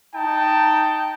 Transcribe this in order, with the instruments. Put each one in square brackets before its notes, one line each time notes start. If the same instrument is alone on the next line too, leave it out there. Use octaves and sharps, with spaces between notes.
[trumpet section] D#4 G5 A5